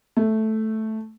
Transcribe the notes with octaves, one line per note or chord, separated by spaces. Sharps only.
A3